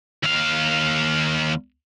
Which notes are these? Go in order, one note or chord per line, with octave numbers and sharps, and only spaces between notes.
D#2 F5